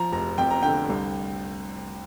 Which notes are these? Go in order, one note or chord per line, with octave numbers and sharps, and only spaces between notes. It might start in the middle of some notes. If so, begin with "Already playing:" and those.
Already playing: F3 A#5
F1 A#5
F2 G5
A#5
D3 G5
C2